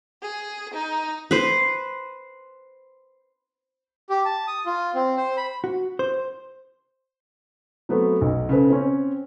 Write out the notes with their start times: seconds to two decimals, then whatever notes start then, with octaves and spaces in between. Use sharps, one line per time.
0.22 G#4
0.73 D#4
1.31 B4 C5
4.10 G4
4.25 A5
4.48 D#6
4.66 F4
4.95 C4
5.17 C5
5.37 B5
5.64 F#4
5.99 C5
7.89 F#3 A3 B3 C4
8.21 B1
8.49 C#3 A4 B4 C5
8.70 C4 C#4